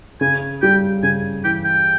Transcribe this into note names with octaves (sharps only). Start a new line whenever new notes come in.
C#3 G#5
G3 G5
C#3 G#5
E3 G5
G5